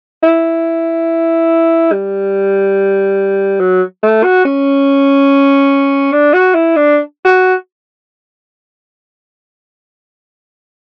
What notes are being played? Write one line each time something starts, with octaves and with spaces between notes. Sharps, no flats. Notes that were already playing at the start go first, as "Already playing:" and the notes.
E4
G3
F#3
A3
F#4
C#4
D4
F#4
E4
D4
F#4